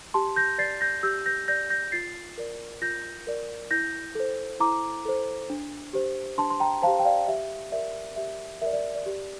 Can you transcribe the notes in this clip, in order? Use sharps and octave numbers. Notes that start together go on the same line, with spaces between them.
G4 A5 C6
G6 A#6
D5 A6 C7
G6 A#6
G4 E6 G6
G6 A#6
D5 G6 A#6
G6 A#6
F4 A6 C7
A#4 D5
F4 G6 A#6
A#4 D5
E4 G6 A#6
A4 C5
E4 A#5 D6
A4 C5
D4
G4 C5
D4 A5 C6
C6
G5 A#5
G4 C5 F5 A5
G5
D5 F5
G4 E5
A#4 D5 E5
G4 E5
A#4 D5 E5
D5
D5
G4